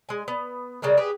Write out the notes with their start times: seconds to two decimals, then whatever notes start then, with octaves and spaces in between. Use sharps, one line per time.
0.09 G#3 G#5
0.28 B3
0.82 C#3 G3 G#3 A#4
0.97 G4 G#4 B4